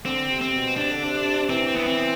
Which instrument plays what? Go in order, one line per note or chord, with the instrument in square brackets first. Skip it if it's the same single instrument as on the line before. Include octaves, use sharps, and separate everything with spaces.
[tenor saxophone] D3 [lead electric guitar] C4
[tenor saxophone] C3
[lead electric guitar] C4
[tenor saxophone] B2
[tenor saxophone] C3 [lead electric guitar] D4
[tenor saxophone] D3
C3
[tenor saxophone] E3 [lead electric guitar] C4
[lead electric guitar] B3
C4